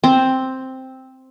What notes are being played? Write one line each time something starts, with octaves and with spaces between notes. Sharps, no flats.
C4